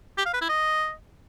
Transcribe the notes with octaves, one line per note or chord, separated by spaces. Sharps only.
G4
F5
B4
E4
D#5